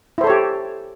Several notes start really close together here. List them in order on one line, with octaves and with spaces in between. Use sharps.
E4 C5 A4 C#5 G4